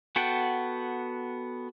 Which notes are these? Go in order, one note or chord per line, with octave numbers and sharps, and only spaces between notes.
B3 F#4 A4 F#5 G5